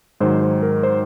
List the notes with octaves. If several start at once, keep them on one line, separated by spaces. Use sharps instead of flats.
G#2 D#3 F#3 C5
C5
A#4
C5